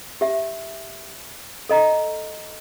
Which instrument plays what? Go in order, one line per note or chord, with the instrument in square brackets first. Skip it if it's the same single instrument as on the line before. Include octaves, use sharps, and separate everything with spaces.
[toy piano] G4 E5
A4 D#5 A#5